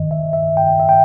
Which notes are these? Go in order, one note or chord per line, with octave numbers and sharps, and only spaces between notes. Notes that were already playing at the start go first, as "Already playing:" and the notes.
Already playing: G2 D#3 D#5
E5
E5
G5
E5
G5